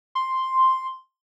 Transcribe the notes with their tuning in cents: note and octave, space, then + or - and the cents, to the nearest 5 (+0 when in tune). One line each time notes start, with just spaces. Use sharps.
C6 +0